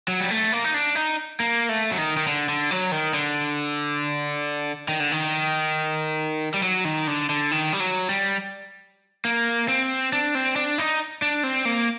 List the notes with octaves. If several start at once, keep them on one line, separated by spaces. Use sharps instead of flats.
F#3
G3
A3
A#3
D#4
D4
D#4
A#3
A3
F#3
D#3
D#3
D3
D3
F#3
D#3
D3
D#3
D3
D#3
G3
F#3
D#3
D3
D3
D#3
G3
F#3
G3
A#3
C4
D4
C4
D4
D#4
D4
C4
A#3